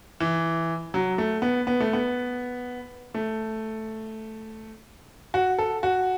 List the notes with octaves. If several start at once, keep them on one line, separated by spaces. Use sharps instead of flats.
E3
F#3
A3
B3
B3
A3
B3
A3
F#4
A4
F#4